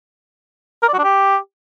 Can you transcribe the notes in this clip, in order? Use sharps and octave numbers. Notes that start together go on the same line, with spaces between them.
A#4
D5
F#4
D4
G4